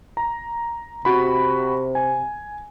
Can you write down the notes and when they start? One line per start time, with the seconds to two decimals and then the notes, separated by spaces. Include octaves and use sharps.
0.17 A#5
1.05 C3 F#4 B5
1.95 G#5